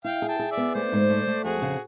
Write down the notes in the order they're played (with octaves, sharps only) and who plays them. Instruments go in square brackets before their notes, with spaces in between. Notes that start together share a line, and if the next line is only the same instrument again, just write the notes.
[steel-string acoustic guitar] E4 [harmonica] F5 G5
[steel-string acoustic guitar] G#4
[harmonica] G5 A5
[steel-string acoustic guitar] G#4
[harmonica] D5 E5
[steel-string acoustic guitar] B3
[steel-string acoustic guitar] A3 [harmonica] C5 D5
[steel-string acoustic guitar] G#2
A3
A3
[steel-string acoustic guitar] F2 [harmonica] F#4 G#4
[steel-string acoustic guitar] C#3